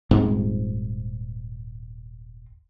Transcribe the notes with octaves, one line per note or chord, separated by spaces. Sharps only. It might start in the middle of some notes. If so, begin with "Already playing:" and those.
D#1 G#2 C4